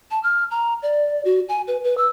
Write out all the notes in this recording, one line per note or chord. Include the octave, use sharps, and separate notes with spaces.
A5
F6
A#5
D5
F#4
G#5
B4
B4
E6